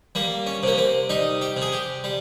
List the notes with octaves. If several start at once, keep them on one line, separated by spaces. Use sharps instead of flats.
G3 A#3
C#4
C3 A#3
C4
G3 D#4
G4
C3
G#4
G4
G3